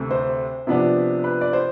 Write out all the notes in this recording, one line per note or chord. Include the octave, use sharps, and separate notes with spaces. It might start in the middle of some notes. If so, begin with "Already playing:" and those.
Already playing: D2 C3 A3 C4
C5
C3 F3 B3 D4
B4
D5
C5